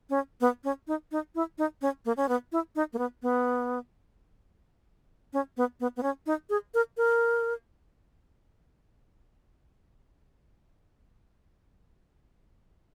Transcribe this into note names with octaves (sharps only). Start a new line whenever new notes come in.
C#4
B3
C#4
D#4
D#4
E4
D#4
C#4
A#3
C#4
B3
E4
D#4
A#3
B3
B3
C#4
B3
B3
B3
C#4
D#4
G#4
A#4
A#4